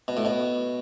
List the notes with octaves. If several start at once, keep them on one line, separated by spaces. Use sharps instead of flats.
B2
A2
B2